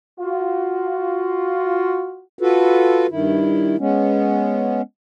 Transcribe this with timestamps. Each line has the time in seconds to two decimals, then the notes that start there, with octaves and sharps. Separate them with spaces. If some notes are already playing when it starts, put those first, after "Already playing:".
0.19 F4 F#4
2.39 F4 F#4 A4 B4
3.10 G2 D#3 E4
3.79 G#3 B3 C#4